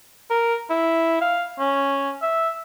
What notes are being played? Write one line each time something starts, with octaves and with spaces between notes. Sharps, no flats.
A#4
E4
F5
C#4
E5